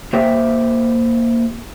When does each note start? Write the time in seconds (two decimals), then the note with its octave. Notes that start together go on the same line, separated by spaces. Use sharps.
0.13 A#3 G4 C5 E5 G5